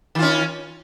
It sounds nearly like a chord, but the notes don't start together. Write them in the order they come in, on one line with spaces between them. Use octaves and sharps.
D#3 F4 C#4